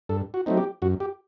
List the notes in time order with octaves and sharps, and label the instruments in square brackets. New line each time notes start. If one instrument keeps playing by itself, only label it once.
[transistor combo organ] G2 A4
F#4
F#3 A3 C4 D#4
G4
F#2 F#4
G4